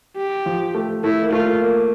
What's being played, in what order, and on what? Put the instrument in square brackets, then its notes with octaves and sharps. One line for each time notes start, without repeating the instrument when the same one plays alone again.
[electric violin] G4
[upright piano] F3
A3
[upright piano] A3 [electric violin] E4
[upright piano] A#3
[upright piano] A3 [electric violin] F4
[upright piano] A#3